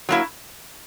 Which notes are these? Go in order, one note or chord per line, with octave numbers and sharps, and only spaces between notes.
F#3 A#3 E4